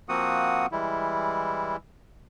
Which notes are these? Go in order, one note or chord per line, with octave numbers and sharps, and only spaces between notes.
F3 A#3 C4 F#4 F#5 D#6
E3 G3 G#3 E4